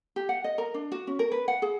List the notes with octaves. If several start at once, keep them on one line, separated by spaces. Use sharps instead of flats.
G4
F#5
D#5
A#4
D4
F#4
C#4
A#4
B4
F#5
G#4